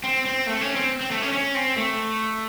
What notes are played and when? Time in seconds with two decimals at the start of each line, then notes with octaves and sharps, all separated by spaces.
0.04 C4
0.26 C4
0.47 A3
0.61 C#4
0.76 C4
1.01 C4
1.11 A3
1.22 C#4
1.33 C#4
1.55 C4
1.76 A3